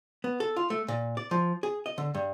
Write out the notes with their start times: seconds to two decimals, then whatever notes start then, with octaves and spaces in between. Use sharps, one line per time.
0.24 B3
0.40 A4
0.56 F4
0.70 A3
0.88 A#2
1.17 D5
1.31 F3
1.63 G#4
1.86 D#5
1.98 D3
2.15 G2